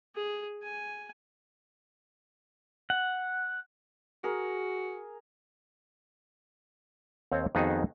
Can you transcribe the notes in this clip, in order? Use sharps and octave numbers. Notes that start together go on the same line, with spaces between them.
G#4
G#5
F#5
F#4 G#4 A#4
D#2 C4 C#5 F5
F2 D#3 B3 D#4 F#4 G#4